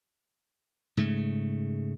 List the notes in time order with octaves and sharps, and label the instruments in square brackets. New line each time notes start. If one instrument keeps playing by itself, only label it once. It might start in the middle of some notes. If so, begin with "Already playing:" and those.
[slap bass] G#2 C#3 A3